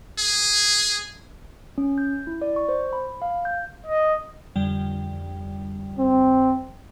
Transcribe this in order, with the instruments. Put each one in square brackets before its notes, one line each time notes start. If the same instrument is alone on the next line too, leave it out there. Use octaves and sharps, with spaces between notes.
[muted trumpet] G#4
[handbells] C#4
G6
E4
D5
C#6
C5
B5
F5
G6
[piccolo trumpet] D#5
[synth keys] F2 D3 G3
[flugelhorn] C4